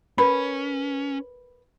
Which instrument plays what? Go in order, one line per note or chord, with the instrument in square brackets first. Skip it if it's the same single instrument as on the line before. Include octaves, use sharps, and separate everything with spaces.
[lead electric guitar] C#4 [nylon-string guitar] A#4 B4 [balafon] B5